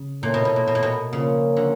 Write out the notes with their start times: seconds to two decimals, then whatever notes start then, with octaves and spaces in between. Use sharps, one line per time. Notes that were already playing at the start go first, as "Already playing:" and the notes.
Already playing: C#3
0.23 A#2 B3 E4 A4 C#5
0.34 B2
0.45 B2
0.56 A#2
0.68 B2
0.75 A#2
0.83 B2
1.12 A#2 C#3 F3 A#3 C#4
1.57 D3